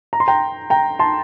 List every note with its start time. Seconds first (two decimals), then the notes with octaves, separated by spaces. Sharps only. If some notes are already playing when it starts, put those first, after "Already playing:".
0.13 A#5
0.20 C6
0.28 G5 A#5
0.70 G5 A#5
0.99 A5 C6